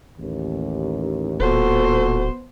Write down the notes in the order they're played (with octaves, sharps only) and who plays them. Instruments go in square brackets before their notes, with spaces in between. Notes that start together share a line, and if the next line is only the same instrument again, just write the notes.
[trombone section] A1 D#2
[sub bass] D1 [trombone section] A#2 F#4 A4 [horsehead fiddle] B3 C5